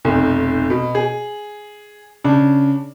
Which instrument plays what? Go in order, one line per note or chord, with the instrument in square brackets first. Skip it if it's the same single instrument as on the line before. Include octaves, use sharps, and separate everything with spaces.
[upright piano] F1 B1
B2
G#4
C#3 D4